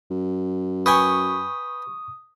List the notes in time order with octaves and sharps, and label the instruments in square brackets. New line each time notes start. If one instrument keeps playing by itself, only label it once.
[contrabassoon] F#2
[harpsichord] B4 G5 G#5 [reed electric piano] C#6 [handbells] D#6